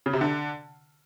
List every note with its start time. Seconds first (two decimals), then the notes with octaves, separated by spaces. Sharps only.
0.06 C#3
0.13 C3
0.21 D3